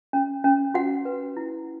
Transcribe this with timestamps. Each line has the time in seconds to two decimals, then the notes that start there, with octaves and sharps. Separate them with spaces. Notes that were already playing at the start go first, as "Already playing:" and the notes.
0.13 C#4
0.44 C#4
0.74 F#4 F#5
1.05 B4
1.37 E4